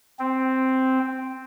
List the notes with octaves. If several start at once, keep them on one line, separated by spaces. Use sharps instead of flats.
C4